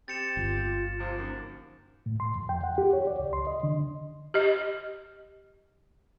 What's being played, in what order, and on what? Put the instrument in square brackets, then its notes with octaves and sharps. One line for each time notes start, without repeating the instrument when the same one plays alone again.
[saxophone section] C4 G4 [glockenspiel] A6 C#7 E7
[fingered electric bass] G1 [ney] F4
[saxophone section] C3 F3
[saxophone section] F#2 A#3 [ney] D#4
[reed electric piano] A2
C6
F2
G5
F#5
G4
C#5
D5
C#2
C6
D#5
D3
[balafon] G4 D#5